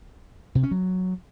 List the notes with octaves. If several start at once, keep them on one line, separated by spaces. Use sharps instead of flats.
C3
C#4
F#3